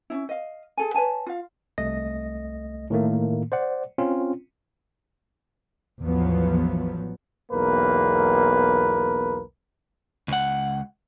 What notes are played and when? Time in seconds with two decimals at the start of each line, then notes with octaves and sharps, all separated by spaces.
0.10 C#4 D4 E4
0.29 D#5 F5
0.77 G#4 A4 G#5
0.94 B4 C#5 G#5 A5
1.26 F4 F5
1.78 C2 A3 D#5 A#6
2.90 A2 D#3 A3 A#3
3.52 C5 D5 F#5
3.98 C4 C#4 F4
5.99 A1 E2 F3 F#3 B3
7.51 B1 E2 A#3 A#4 B4
10.28 C#2 F#5